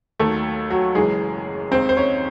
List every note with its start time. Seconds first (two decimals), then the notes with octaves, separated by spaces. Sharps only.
0.19 D#2 D#3 F#3 A3 A4
0.70 F#3 F#4
0.95 F#1 F#2 E3 G#3 G#4
1.71 D#2 D#3 G#3 C4 C5
1.89 C5
1.97 C#4 C#5